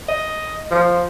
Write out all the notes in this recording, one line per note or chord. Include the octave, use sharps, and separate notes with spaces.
D#5
F3